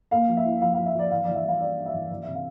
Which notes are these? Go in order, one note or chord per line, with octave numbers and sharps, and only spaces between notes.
A#3 F5
F3
E5
E4
F3 F5
F3 F5
E5
F3 D5
E3 F5
E3 D5
E5
G3 F5
D4 D5
D4
E5
E3
E3 D5
C3 E5
F5